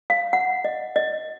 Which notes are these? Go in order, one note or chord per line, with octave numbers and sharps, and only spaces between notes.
F5
F#5
D#5
D#5